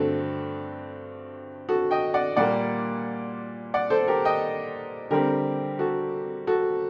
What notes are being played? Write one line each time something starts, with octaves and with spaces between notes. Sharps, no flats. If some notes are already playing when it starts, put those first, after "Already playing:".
Already playing: G2 D3 A3 C4 F#4 A4
F#4 A4
D#5 G5
D5 F#5
A#2 G3 A#3 D5 F#5
D5 F#5
A4 C5
G4 A#4
D#5 G5
D3 G3 C4 G4 A#4
F#4 A4
F#4 A4